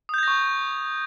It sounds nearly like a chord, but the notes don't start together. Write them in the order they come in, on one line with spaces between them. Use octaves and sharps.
D#6 G6 G#6 A#6 C#6